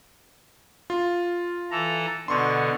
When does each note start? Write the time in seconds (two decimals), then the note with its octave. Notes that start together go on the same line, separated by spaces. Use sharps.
0.90 F4
1.71 E3 A4 A#5
2.28 B2 D3 C6 C#6